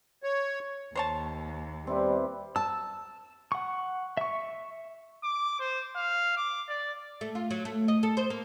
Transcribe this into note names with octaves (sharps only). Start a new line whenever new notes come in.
C#5
D#2 C5 C#5 A5
G3 C4 E4 B4
A5 E6
F#5 C#6
E5 C#6
D6
C5
F5
D6
D5
A3
F4
F#3
A3
D#5
A4
C5
A#3